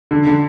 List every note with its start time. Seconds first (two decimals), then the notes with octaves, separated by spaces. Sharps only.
0.11 D3
0.27 D3